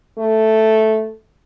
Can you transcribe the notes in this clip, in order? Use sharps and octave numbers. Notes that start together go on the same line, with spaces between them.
A3